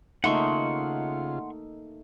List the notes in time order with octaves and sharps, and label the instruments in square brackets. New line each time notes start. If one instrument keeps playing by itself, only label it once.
[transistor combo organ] C#3 F4 [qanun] A3 A#3 [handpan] D#4 [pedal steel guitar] F#5 C6 C#6